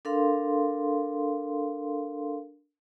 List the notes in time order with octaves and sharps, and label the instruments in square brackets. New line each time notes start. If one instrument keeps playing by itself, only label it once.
[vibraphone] D4 A4 A#4 F5 C6